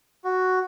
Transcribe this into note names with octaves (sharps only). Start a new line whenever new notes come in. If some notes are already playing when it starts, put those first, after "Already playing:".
F#4